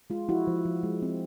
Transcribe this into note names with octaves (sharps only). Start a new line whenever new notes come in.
G#3 F4
F3 E4 F#4
F3
F3
G#3
C4